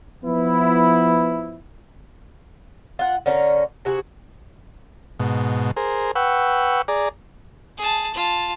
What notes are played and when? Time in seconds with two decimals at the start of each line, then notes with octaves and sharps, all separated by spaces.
0.24 F3 B3 E4
2.99 F4 F#5
3.26 D3 C#4 D#4 A#4
3.85 C3 F#4 G#4
5.19 G#2 B2
5.77 G#4 A#4 C5
6.15 B4 F#5 G5 C#6 E6
6.88 G#4 D5 A#5
7.78 G#4 A5
8.14 F4 A5